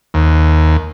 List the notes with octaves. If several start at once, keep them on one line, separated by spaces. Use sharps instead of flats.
D#2